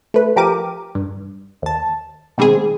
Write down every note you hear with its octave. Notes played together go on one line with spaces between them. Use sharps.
A3 B4
F3 G4 A#4 D6 D#7
G2
D#2 A5
B2 D#3 G3 G#3 C4 G#4